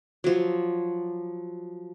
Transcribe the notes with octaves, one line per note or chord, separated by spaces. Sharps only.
F3 F#3